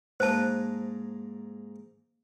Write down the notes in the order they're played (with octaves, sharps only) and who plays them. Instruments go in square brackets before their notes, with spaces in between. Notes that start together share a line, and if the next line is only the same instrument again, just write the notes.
[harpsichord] G#2 A#3 [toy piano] C5 A5